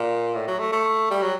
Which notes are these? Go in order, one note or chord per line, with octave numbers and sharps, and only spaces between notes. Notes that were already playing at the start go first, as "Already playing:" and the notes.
Already playing: A#2
A2
F#3
A3
A3
G3
F#3